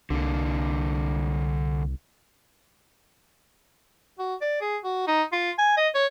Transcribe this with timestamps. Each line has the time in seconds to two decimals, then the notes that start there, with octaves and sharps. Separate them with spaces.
0.10 C2 D3 A#3
4.19 F#4
4.42 D5
4.61 G#4
4.84 F#4
5.08 D#4
5.33 F4
5.58 G#5
5.77 D#5
5.95 C#5